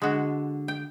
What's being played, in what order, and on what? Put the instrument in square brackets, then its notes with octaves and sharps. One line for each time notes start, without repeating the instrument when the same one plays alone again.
[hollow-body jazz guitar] D3 [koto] G#3 F#4
[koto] G5